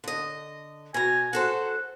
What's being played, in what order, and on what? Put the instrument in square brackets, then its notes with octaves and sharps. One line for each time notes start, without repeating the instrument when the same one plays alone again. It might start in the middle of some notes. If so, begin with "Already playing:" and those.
[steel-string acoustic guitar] D3 D#5
[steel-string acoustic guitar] B2 A#5 [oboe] G#5
[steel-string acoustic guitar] F#4 A4 C5 [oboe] F#5